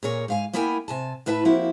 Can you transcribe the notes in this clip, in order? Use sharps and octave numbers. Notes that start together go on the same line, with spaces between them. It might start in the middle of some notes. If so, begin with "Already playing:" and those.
A#2 G#4 A#4 C#5
G#2 F5 G#5
A#3 B3 E4 A#4 G5 G#5
C3 G#5 A5
A2 E4 B4 E5 G5 A5
F3 A#3 C4 E4 F#4 G4